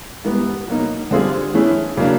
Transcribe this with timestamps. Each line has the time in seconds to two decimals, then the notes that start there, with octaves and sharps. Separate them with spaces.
0.24 G#2 E3 G3 B3
0.68 B2 F#3 A#3 D#4
1.11 D3 G3 C4 F4 G#4
1.54 E3 A3 C#4 E4 G#4
1.97 C#3 F#3 A#3 D4